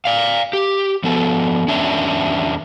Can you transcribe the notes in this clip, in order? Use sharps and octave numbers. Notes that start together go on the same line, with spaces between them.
D5 F5
G4
F3 B3 A4
E2 C#4 D4 E5